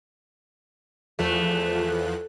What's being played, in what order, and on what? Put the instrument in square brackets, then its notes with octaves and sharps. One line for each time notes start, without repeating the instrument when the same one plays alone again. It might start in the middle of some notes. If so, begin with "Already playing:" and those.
[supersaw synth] E2 F3 F#6 [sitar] A3